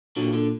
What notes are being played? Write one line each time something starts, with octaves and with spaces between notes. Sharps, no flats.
A#2 D3 F#3
D3